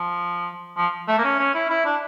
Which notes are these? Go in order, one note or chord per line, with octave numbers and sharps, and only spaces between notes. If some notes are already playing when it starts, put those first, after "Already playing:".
Already playing: F3
F3
A3
A#3
C#4
C#4
E4
E4
D4